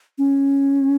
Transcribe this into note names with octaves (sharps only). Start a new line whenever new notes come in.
C#4